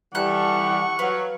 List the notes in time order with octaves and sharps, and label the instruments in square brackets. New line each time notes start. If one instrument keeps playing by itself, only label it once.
[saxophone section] E3 G3 [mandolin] A4 F#6 [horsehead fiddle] F#5 [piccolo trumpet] C#6
[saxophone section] F#3 [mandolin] B4 F5